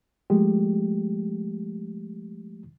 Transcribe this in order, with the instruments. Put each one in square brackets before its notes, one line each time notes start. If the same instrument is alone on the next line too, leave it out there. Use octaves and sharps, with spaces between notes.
[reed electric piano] F3 G#3 A3 G4